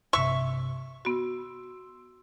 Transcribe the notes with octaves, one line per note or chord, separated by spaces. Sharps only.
A#1 G2 C3 E5 C#6
B3 F#4 C6 E6